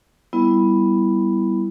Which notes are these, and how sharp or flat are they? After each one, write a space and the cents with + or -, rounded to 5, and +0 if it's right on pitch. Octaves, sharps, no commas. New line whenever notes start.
G3 +0 B3 +0 E4 +0